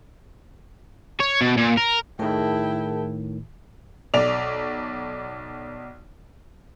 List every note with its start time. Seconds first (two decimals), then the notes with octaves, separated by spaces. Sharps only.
1.20 C#5
1.41 B2
1.57 A#2
1.77 A#4
2.19 A2 D#3 E4 G#4 A#4 G5 A5
4.14 B1 D5 F7